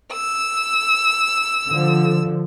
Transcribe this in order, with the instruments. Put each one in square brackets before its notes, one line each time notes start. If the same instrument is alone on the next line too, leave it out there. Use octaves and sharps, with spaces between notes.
[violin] E6
[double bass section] D3 F3